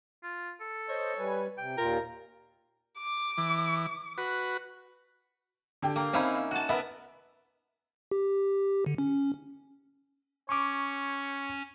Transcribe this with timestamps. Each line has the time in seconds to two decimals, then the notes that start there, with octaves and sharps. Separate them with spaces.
0.23 F4
0.61 A4
0.89 C5 C#5 D#5
1.18 G3 B4 G#5
1.58 C3 G5
1.77 D#2 A#2 F4 A#4
2.97 D6
3.38 E3
4.18 F#4 B4
5.82 D3 G4 G5
5.96 A#3
6.13 C4 C#4 D#4 E4 F5 B5
6.51 F#4 F#5 A5
6.69 B3 A#4 B4 E5
8.11 G4
8.86 D3
8.98 C#4
10.49 C#4 C#5 C#6 D6